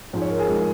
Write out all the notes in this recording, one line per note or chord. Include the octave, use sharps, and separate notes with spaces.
G#2 F3 G#3
C#5
A#4
G#4
G#2 F3 G#3